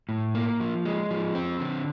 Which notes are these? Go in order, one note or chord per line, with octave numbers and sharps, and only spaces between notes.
A2
A#3
F3
G#3
F3
C4
D3